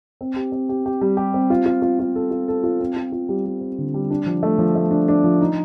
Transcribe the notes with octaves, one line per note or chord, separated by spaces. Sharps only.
C4
G4
C4
G4
G4
G3
G4
C4
F4
F4
F4
F4
A4
F4
A4
F4
C4
F4
F4
G3
G3
C4
D3
G3
D4
F3
A3
F3
A3
D4
D4
F3
D#4